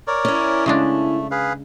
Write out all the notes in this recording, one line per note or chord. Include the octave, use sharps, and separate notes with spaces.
A#4 C#5 D5
C#4 E4
C#3 G#3 A3 D4
G#4 B4 F5